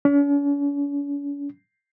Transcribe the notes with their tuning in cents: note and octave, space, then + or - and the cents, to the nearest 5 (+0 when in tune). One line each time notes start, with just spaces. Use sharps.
C#4 +45